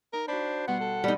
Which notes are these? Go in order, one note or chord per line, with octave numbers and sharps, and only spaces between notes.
D#4 A#4
D4 F#4 C5 B5
B2 G3 B3 F#5 C6
A4
E2 A2 G3 D#4